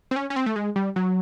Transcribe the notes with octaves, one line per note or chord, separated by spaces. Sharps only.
C4
C#4
C#4
C4
A3
G#3
G3
F#3